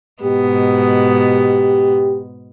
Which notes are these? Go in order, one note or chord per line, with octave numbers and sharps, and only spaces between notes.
G#2 B2 B3 G4